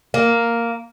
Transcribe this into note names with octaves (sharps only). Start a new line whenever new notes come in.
A#3